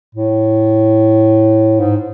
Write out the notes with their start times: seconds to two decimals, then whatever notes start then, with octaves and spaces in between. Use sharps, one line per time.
0.15 A2
1.80 G#2